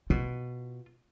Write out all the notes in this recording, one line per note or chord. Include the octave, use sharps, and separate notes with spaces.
B2 F4